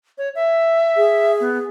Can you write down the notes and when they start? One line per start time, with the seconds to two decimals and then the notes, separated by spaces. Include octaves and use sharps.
0.18 C#5
0.35 E5
0.96 G#4
1.40 B3